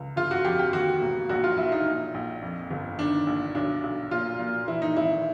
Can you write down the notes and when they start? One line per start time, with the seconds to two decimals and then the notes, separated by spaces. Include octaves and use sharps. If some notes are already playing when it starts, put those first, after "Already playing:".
Already playing: C#2
0.16 G1 F4
0.31 F#4
0.45 F2 G4
0.59 G4
0.73 D#2 F#4
1.01 E1
1.29 A#1 F#4
1.44 F4
1.57 A#1 E4
1.72 D#4
1.86 A#1
2.14 A#1
2.42 F2
2.71 G1
2.99 D#3 D4
3.27 A#1
3.55 B1 D4
3.83 B1
4.11 A#2 F4
4.39 A#2
4.68 E3 E4
4.82 D#4
4.96 G#1 E4